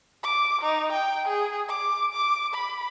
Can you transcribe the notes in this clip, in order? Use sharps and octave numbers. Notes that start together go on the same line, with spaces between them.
D6
D#4
G5
G#4
D6
D6
B5